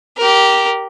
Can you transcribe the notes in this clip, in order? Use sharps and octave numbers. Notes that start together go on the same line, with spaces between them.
G4 A#4